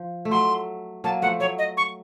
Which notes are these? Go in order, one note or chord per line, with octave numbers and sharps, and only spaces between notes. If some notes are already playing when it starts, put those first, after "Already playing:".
Already playing: F3
A3
F#3 C6
F#3 A#3 A5
F3 A3 F#5
F#3 C#5
D#5
C#6